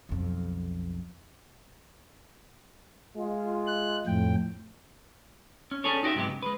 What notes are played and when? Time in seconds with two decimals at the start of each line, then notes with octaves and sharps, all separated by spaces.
0.09 B1 F2
3.16 G#3 F4
3.67 F#6
4.07 F2 A2 G5
5.71 C#4
5.84 C#4 D4 G#4 A4 C#5
6.03 D#4 F#4 G4 D5 E5
6.15 G#2 C3 F#3 G#3 B3 G4
6.28 C#3
6.42 G#3 B4